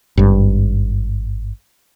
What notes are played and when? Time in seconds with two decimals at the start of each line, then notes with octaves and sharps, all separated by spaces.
0.17 G#1 G2